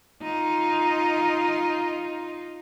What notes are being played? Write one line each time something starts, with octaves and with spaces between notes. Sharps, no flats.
D#4 F4